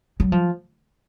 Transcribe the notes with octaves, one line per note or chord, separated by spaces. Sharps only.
F#3
F3